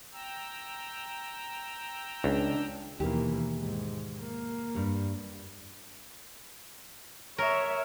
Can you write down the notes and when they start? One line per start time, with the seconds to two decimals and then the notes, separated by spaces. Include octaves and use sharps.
0.12 G5 A#5 E6
2.24 C#2 D4
3.00 D#2 B2 E3 A#3 G4
3.57 G#2
4.19 A#3
4.75 G2 G3
7.38 A#4 C#5 E5